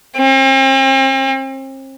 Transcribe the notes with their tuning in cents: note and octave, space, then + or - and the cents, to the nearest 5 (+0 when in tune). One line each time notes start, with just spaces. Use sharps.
C4 +40